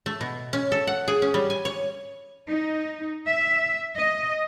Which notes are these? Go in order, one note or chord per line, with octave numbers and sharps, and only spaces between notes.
A3
B2
C#4
A4
F#5
G#4
C#4
G3
G#5
C#5
D#4
E5
D#5